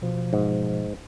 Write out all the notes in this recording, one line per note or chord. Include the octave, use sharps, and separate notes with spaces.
B2 F3
G#2